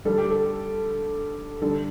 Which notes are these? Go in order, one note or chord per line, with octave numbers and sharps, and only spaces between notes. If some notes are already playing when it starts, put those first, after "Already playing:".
D3 G3 D4 A4
G4
A4
D3 G3 D4 A4